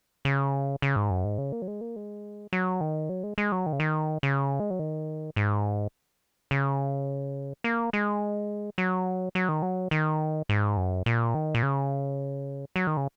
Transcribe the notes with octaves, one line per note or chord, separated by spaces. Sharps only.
C#3
C#3
G#2
F#2
G#2
C#3
A#3
F#3
G#3
A#3
G#3
F#3
D#3
F#3
G#3
G#3
F#3
D#3
C#3
D#3
C#3
G#3
F#3
D#3
G#2
C#3
A#3
G#3
F#3
F#3
D#3
F#3
D#3
G#2
F#2
A#2
D#3
A#2
C#3
F#3
D#3
C#3